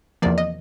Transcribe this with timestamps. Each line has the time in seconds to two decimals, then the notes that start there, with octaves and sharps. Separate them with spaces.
0.22 E2 C3 F3 A#3 D5
0.38 D#5